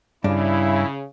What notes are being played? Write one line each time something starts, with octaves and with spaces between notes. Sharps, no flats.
G2 C#3 D4 E4